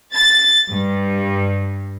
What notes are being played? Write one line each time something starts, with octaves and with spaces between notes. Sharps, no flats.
A6
G2